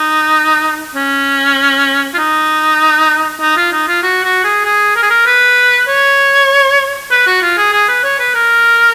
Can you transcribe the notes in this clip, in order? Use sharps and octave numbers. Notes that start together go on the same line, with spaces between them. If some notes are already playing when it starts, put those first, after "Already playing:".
Already playing: D#4
C#4
F4
D#4
D#4
F4
D#4
F4
F#4
F#4
G#4
G#4
A#4
G#4
A#4
B4
C#5
B4
F#4
F4
G#4
G#4
B4
C#5
B4
A#4